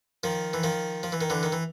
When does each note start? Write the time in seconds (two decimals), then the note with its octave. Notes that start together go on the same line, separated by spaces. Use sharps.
0.24 D#3 F3
0.53 E3
0.63 D#3 F3
1.03 F3
1.12 E3
1.21 D#3
1.30 D3 E3
1.43 D#3
1.52 E3